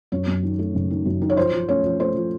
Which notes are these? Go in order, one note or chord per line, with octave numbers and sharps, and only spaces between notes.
F#2 C#4 C#5
F#2
D#3
A3
F#1
D#3
F#2
D#3
C#5
F3 C5
F3
A3 C#4 C#5
F3
A3 C5
F3